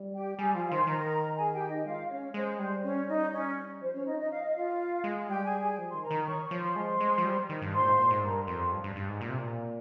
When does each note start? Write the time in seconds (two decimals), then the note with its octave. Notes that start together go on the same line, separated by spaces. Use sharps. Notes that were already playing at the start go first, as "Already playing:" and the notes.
Already playing: G3
0.13 G4 G5
0.38 G3 G#4 G#5
0.55 F3 F4 F5
0.71 D#3 C5 C6
0.87 D#3 A#4 A#5
1.37 G#4 G#5
1.53 G4 G5
1.69 D#4 D#5
1.85 G#3 F4 F5
2.10 C#4 C#5
2.34 G#3 C5
2.59 G3 C5
2.84 C#4 C#5
3.08 D#4 D#5
3.33 C#4 C#5
3.81 F3 C5
3.94 C#4 C#5
4.06 D#4 D#5
4.18 D#4 D#5
4.30 F5
4.43 D#5
4.55 F4 F5
5.04 G#3
5.29 G3 G4 G5
5.45 G#4 G#5
5.61 G#4 G#5
5.78 F3
5.90 D#3 C6
6.02 A#4 A#5
6.11 D#3
6.26 C#5 C#6
6.43 C#5 C#6
6.51 F3
6.59 C5 C6
6.76 G#3
7.00 G#3
7.18 F3
7.25 G3
7.49 D#3
7.62 G2
7.74 G#2 C5 C6
7.80 A#2
7.86 G#2
7.98 A#2
8.10 G#2
8.23 G2 A#4 A#5
8.47 F2 C5 C6
8.72 G2
8.84 G2
8.96 G2
9.09 G#2
9.21 A#2
9.29 C3
9.38 A#2